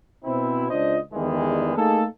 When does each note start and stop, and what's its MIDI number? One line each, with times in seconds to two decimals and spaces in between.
0.24 0.68 47
0.24 0.68 60
0.24 0.68 64
0.69 0.97 37
0.69 0.97 62
0.69 0.97 65
0.69 0.97 72
0.69 0.97 75
1.12 1.73 40
1.12 1.73 43
1.12 1.73 51
1.12 1.73 52
1.12 1.73 55
1.12 1.73 56
1.76 2.03 57
1.76 2.03 58
1.76 2.03 63
1.76 2.03 68
1.76 2.03 69